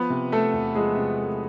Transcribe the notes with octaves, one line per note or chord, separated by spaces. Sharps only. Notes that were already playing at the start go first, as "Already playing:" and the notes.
Already playing: F3 B3 B4
C3
A3 A4
E2
F3 G#3 G#4
C3
A3